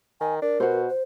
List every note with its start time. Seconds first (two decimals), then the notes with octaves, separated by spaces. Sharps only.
0.21 D#3 G#5
0.42 D4 A#4
0.60 B2 F#4 C5
0.89 C5